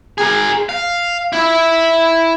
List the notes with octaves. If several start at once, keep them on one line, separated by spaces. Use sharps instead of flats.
G#4 A#4
F5
E4 E5